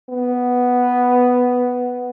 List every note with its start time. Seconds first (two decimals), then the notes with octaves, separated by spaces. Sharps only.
0.09 B3